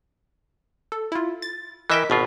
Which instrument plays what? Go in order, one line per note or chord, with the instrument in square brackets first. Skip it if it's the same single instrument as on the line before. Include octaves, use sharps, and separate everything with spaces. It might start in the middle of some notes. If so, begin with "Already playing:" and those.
[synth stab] A4
E4 F4
A6
[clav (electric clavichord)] E3 E5 G5 [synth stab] A#4 D#5 B6
[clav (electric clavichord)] G#1 B2 F4